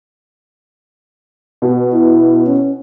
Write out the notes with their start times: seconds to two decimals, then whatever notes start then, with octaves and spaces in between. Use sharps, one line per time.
1.62 B2
1.93 E4
2.46 C#4